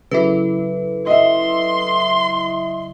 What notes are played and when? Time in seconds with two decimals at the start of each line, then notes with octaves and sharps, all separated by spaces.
0.11 C#3 F#3 E4 A4 B4
1.07 D#5 E5 C6